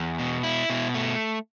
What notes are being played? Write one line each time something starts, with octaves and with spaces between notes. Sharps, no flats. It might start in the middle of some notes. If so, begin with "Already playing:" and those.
Already playing: E2
B2
E4
B2
A3